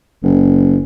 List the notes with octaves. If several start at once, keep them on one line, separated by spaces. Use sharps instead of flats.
F#1